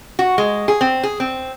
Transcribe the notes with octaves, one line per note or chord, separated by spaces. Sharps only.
F#4
G#3
G#4
C4
G#4
C4